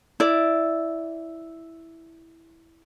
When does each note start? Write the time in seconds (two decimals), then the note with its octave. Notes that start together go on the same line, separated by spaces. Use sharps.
0.20 E4 D5